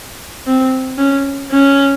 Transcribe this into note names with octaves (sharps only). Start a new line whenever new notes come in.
C4
C#4
C#4